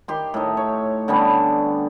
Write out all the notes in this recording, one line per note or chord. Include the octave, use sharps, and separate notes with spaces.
D#3 G4 C6
A2 D#4
C#5
D3 G3 B3 C#4